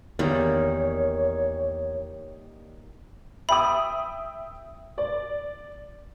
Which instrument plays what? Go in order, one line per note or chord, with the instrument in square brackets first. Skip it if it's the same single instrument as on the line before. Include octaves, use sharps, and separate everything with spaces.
[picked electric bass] E2 [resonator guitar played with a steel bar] A#2 D#3 G3 [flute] C#5
[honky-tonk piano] E5 G5 D#6 [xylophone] B5
[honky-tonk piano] D5